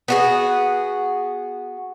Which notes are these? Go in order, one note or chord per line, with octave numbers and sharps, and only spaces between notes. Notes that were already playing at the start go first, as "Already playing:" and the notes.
B3 F#4 G#4